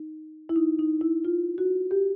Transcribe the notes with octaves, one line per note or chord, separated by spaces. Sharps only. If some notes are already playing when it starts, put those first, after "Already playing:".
Already playing: D#4
E4
D#4
D#4
E4
F4
F#4
G4